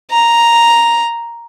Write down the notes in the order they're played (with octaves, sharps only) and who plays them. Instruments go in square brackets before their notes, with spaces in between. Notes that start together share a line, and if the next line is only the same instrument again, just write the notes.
[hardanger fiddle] A#5